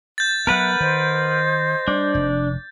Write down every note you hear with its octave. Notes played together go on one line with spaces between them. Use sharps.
G6 A6
F#3 B3 A#4 B4 E5 F#5
D#3 C5 D#5
G3 D4
F1